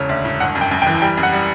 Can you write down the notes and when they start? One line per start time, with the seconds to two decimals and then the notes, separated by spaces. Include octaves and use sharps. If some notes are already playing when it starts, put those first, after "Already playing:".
Already playing: E1 C#3 C#5
0.09 D2
0.25 E1
0.40 G1 F#5
0.55 F#2
0.61 G5
0.71 F#2
0.82 G5
0.87 E3
1.02 G3 G5
1.17 F#2
1.23 F#5
1.32 G3